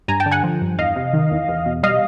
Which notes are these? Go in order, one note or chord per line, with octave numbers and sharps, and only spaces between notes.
G2 G#5 A#5
G5 A5
D3
F#5 G#5
F3
G2
E2 D#5 F5
C3
D#3
E2
E2
B2
G3 D#5 F5